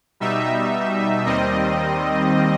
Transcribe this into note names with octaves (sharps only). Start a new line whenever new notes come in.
B2 G3 D#4 E5
D#2 D#3 G3 C4 D#5